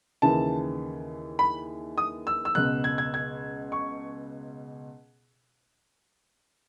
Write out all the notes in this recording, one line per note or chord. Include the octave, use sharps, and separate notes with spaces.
D#2 C#3 E3 A5
B5
D#6
E6
E6
C#2 B2 F#6
G#6
G#6
G#6
C#6